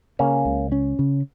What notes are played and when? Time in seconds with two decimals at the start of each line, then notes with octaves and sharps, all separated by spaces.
0.19 C#3 A#3 C#4
0.45 C#2
0.72 C#4
0.99 C#3